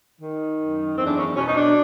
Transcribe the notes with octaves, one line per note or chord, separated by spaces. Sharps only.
D#3
F#2
E2 C4
D4
C#4
B2 C#4
D#4
D4